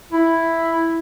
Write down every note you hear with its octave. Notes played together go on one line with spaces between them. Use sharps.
E4